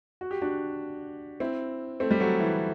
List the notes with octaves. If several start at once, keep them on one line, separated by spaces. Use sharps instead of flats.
F#4
G4
D4 F#4
C4 E4
A3 C4
G3
F#3 A3
E3